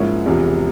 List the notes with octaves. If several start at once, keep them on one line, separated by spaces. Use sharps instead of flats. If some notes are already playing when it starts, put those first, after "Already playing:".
Already playing: G#2 F3 A#3 C#4 E4
E1 E2 C3 F3